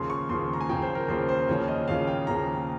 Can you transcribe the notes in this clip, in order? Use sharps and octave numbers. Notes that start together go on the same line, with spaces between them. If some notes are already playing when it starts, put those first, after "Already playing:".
Already playing: D#2 C#3 F3 C6
C#6
D#2 C#3 F3 C6
A#5
G#5
D#2 C#3 F3 G5
C5
A#4
D#2 C#3 F3 C5
C5
D#2 C#3 F3 C#5
D#5
D#2 C#3 F3 F5
G5
D#2 C#3 F3 A#5